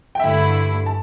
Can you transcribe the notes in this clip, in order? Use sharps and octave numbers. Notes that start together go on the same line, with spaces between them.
G5
G2 D3 A3 E4 E5
A5